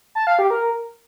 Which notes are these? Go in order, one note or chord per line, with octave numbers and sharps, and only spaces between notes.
A5
F5
G4
A#4